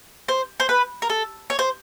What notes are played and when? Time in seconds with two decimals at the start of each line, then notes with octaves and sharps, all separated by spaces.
0.28 C5
0.60 C5
0.69 B4
1.02 A#4
1.10 A4
1.50 C#5
1.59 C5